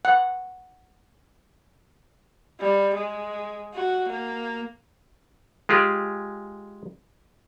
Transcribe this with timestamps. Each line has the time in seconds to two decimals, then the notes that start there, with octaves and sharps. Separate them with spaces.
0.05 F#5
2.60 G3
2.94 G#3
3.74 F#4
4.09 A#3
5.69 G#3 F4 G4 G#4